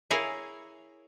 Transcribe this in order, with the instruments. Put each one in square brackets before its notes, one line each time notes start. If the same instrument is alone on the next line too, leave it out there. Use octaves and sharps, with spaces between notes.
[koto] E4 G#4 A#4 C#5 F5